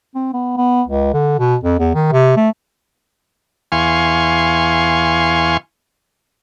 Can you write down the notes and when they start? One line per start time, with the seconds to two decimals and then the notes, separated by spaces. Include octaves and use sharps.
0.15 C4
0.33 B3
0.57 B3
0.87 C#2
1.14 D3
1.39 B2
1.63 F2
1.79 E2
1.95 D#3
2.12 C3
2.36 A3
3.72 E2 F5 G#5 C6 C#6